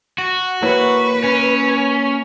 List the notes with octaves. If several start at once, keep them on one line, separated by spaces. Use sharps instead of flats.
F#4
A#3 E4 B4 C#5
C#4